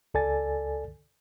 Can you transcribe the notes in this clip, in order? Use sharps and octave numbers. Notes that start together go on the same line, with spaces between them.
C#2 A4 D5 G#5 A6